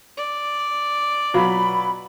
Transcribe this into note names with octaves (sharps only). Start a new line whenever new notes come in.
D5
B2 F#3 F4 B5